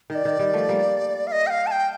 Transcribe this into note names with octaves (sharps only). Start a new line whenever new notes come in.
D#3 D#5
D5
D#3
D#3 G3
F3 A3
G3 A#3
F5
D#5
G5
F5
A5
G5